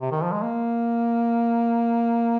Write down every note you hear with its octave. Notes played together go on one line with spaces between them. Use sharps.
C3
D#3
F3
G#3
A#3